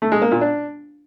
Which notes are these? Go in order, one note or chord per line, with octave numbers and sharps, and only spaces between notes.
A3
G#3
A#3
A#2
D4